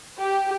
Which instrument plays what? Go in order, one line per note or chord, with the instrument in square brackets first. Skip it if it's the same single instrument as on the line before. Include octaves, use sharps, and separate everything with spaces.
[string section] G4